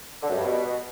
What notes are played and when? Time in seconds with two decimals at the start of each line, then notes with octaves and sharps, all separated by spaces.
0.23 D3
0.30 F#2
0.37 G2
0.44 B2